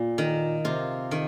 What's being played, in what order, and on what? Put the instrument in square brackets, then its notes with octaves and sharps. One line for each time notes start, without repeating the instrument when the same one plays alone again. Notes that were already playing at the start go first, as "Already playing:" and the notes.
Already playing: [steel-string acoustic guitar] A#2
[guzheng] D#3
[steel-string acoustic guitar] C3 [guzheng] F4
[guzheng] D#3